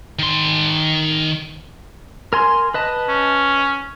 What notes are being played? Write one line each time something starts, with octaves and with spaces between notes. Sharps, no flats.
D#3 C6
A#4 G#5 C6
B4 D#5 A5
C#4